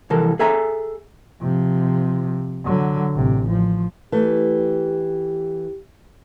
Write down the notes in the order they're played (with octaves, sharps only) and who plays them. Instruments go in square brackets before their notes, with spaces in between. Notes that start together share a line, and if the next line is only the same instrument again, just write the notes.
[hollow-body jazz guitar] C2 F2 E3 A4 A#4
G#4 A4 E5 G#5 A#5
[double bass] C3 F3
D3 F#3
A1 C3
F3
[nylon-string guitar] E3 A3 [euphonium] G4